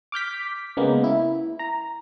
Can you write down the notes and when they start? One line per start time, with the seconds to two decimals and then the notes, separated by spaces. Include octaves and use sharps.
0.12 D6 F6 G6 B6
0.77 C#3 G#3 A#3 B3
1.04 E4
1.59 A#5